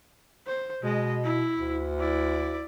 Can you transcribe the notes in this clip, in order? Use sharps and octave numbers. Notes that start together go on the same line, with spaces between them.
C5
B2 G#3 D#5
E4
D2
E4 D5